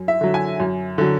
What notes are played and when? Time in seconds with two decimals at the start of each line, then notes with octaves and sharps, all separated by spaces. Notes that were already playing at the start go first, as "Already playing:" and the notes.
Already playing: F#2
0.08 E5
0.21 D3 F#3
0.34 G#5
0.60 F#2
0.98 D3 F#3